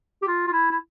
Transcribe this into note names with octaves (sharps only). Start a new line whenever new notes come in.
G4
F4
F4
E4
E4